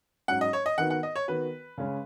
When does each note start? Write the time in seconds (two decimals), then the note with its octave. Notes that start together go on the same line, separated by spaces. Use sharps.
0.28 G#2 F#3 C#4 F#5
0.41 D#5
0.53 C#5
0.66 D#5
0.78 D#3 B3 D#4 F#4 F#5
0.90 F#5
1.03 D#5
1.16 C#5
1.28 D#3 B3 F#4 B4
1.78 C#3 G#3 C#4 G#4